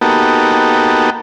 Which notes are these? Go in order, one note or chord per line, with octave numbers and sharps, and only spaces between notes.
A#3 B3 D#4 F#4 G4 A4